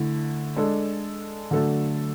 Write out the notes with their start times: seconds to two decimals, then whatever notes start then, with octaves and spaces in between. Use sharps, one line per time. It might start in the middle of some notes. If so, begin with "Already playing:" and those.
Already playing: D3 A3 E4
0.56 G#3 D4 A4
1.51 D3 F#3 A3 D4 A4